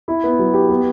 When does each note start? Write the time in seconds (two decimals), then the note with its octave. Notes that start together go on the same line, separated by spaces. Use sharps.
0.08 E4
0.24 B3
0.39 F#3
0.54 G4
0.69 B3